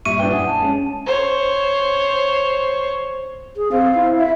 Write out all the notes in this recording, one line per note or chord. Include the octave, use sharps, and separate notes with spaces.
G2 A#2 G3 E5 C#6 D#7
D4 E4 B4 G5
F#2 F#5 G#5 D#6
A5
G#3 C#4
C5 C#5
G#4
C4 F5
E4
E5